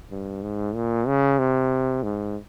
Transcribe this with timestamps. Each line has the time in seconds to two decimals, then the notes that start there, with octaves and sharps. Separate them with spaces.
0.11 G2
0.42 G#2
0.75 A#2
1.08 C#3
1.39 C3
2.03 G#2